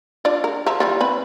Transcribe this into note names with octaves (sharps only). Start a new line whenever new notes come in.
D4 F4 D5
A#4
F3 E5 A#5
E3 G3 F4
C4 B4 B5